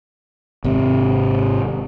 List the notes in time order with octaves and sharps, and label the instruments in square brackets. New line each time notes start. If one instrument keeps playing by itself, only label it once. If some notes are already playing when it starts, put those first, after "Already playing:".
[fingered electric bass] G#1 C3 C4